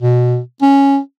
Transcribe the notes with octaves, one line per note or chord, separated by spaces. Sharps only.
B2
C#4